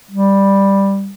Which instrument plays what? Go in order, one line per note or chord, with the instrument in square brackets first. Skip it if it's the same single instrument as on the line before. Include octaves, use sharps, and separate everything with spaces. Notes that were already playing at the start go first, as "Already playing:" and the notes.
[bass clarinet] G3